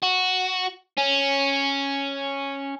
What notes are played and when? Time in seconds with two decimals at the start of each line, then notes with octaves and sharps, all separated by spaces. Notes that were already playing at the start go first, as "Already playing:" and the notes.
0.03 F#4
0.98 C#4